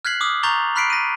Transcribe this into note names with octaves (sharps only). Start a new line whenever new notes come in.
F6 F#6 G#6 B6 C7 F#7
D6 D#6 F6
A#5 C#6 G6 A6 F7 G7
B5 F6 F#6 B6 C7 D7
A#6 D#7